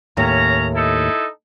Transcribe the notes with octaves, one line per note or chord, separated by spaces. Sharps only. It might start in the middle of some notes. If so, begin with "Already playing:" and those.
D#2 A2 C#4 A#5
D#4 E4 A4